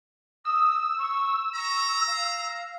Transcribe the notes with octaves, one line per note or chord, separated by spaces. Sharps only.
D#6 E6
C#6
A#5 C#6
F5